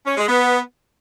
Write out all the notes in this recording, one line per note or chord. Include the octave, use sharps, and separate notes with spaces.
C#4
G#3
B3